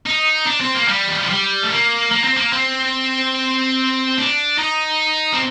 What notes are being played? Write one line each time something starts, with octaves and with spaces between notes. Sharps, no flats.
D#4
D4
C4
A#3
G3
D#3
F3
G3
A3
A#3
A#3
C4
A#3
C4
D4
D#4
C4